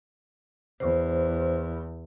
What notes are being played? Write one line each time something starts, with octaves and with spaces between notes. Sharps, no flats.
E2 C5